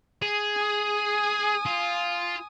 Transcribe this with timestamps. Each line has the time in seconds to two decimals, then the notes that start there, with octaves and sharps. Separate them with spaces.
0.22 G#4
0.57 G#5 D#6
1.66 F4